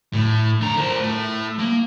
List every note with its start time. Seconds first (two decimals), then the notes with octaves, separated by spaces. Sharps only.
0.13 A2
0.61 D3 A#5
0.77 A#4 C5
1.00 A2
1.59 A#3